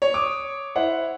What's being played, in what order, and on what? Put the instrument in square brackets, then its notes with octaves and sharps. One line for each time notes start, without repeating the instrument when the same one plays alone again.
[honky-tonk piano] C#5
[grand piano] D6 D#6
E4 C5 F#5